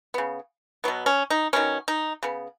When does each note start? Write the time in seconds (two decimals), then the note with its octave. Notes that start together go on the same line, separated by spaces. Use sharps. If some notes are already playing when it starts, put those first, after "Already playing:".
0.14 C#3 B3
0.84 B2 F#3 B3
1.06 C#4
1.30 D#4
1.53 D#3 F#3 B3 C#4
1.88 D#4
2.23 C#3 B3